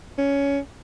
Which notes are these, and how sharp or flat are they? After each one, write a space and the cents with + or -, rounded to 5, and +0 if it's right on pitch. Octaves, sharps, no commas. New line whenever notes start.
C#4 +15